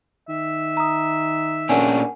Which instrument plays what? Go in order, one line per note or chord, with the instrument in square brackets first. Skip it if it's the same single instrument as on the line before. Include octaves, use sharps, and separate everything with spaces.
[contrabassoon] D#3 [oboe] E5
[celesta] A#5 D#6
[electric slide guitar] A#2 C#4 D4 [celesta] A#4 F#5 G#5